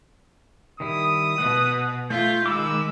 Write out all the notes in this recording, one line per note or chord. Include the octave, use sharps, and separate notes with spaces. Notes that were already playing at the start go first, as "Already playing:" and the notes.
D#3 G3 E4 D#6
B2 F#5
A3 F4 E5 G6
D#3 G#3 B5 D6 E6